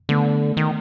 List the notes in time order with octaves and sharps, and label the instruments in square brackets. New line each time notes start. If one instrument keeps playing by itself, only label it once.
[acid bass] D3 [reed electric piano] A3 B3
[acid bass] D#3